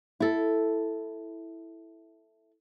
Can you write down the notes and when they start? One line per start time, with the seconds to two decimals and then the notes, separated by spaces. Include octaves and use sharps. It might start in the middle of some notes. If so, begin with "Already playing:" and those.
0.20 E4 A4